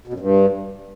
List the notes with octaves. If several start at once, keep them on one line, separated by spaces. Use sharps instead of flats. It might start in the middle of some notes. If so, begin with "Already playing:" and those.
B2
F#2
G2